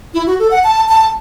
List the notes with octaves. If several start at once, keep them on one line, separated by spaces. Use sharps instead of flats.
E4
F#4
A4
F#5
A5
A5